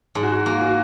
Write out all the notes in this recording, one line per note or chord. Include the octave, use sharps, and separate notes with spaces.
G#2 G#4
F#4
G#4
A#3
F#4